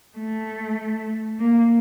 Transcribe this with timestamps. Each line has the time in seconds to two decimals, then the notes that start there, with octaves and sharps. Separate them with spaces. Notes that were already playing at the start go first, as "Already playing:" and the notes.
0.18 A3
1.39 A#3